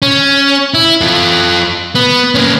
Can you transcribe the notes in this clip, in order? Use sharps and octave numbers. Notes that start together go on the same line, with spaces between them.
C#4
E4
F4 A4
B3
A#3 C#4